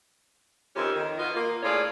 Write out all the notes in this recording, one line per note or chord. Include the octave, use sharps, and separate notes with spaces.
F2 D#3 C#4 G4 E5
D#3
B2 B3 F4 D#5
A#3 F4
A2 F4 G#4 C#5 D5